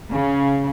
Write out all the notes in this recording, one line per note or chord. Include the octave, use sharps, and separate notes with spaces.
C#3